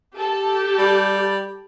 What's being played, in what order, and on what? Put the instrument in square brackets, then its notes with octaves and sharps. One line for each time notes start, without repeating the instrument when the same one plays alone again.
[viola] G4 [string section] A4 A5
[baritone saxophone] G3